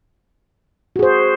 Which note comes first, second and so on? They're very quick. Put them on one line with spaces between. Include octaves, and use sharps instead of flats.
F#4 G#4 C5